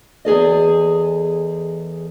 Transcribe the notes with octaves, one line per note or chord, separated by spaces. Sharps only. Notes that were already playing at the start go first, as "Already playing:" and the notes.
E2 G#4 A4 D#5